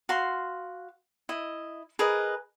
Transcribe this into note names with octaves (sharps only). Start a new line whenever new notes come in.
F#4 F5 C6
E4 D#5
G#4 A#4 B4 D#5